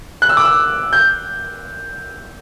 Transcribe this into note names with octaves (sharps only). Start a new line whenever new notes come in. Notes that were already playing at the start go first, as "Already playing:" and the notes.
F#6
E6
D6
E6
G6